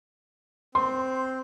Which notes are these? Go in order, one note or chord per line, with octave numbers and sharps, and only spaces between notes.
C4 C6